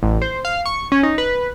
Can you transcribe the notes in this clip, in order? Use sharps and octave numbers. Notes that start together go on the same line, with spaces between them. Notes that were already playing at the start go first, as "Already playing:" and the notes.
A1
C5
F5
C#6
C#4
D#4
B4